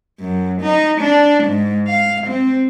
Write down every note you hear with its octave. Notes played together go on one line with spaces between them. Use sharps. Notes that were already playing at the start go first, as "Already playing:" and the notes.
F#2
D#4
D4
G#2
F5
C4